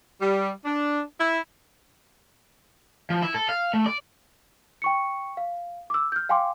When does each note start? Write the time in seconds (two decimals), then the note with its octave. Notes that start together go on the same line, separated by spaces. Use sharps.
0.21 G3
0.65 D4
1.19 E4
3.10 F3
3.22 E4
3.34 A4
3.49 F5
3.73 A3
3.86 D5
4.82 G5 C#6 C#7
5.37 F5
5.90 D6 E6
6.12 F6 G6
6.29 F5 G5 G#5 C6 D6